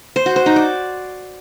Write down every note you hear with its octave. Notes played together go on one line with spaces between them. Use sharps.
C5
F#4
C5
D#4
D5